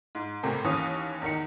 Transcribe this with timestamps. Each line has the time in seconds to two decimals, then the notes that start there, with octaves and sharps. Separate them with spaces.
0.15 G#2
0.43 A2 C3 A#3
0.64 D#2 E3 C#4 D#6
1.22 E2 D#3 C#7